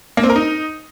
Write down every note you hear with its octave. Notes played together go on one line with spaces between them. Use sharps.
A#3
C4
A#4
D#4